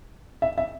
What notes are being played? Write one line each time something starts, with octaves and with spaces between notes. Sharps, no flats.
E5
E5